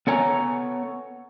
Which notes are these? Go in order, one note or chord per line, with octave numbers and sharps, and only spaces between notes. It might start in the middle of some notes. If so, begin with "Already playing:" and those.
B3 A4 C#5 G#5 A#5